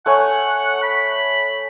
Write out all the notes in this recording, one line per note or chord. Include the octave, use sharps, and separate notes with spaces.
A3 C#5 F#5 G#5
B5